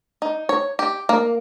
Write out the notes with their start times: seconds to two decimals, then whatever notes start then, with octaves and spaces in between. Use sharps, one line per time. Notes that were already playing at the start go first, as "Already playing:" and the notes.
0.22 D#4
0.49 C#5
0.79 G4
1.09 A#3